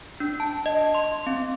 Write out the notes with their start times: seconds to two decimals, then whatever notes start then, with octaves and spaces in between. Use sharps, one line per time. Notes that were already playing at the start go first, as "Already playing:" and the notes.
0.20 D4
0.40 A5
0.66 D#5
0.95 C6
1.27 C4